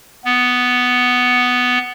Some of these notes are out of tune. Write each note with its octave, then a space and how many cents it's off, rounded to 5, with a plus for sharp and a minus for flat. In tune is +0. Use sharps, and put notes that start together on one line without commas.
B3 +5